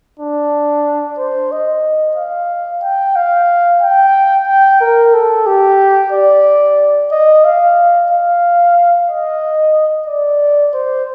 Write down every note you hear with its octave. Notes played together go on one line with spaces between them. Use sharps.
D4
C5
D#5
F5
G5
F5
G5
G5
A#4
A4
G4
D5
D#5
F5
F5
D#5
D5
C5